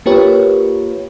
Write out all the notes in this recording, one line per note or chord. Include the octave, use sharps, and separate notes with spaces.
A#3 F4 G4 A#4 B4 C#5